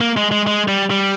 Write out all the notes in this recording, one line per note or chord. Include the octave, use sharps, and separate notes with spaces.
A#3
G#3
G#3
G#3
G3
G3